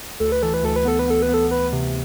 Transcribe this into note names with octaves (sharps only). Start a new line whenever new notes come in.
D2 A4
B4
E3 A4
B4
D2 A4
B4
B3 A4
B4
B3 A4
B4
B3
A4
B3 B4
C3